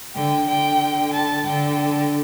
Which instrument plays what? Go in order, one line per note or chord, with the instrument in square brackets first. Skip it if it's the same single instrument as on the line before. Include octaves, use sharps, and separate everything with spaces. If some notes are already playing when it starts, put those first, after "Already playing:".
[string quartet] D3 [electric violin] G5
[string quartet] D3 [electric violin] G5
[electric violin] A5
[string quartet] D3 [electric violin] G5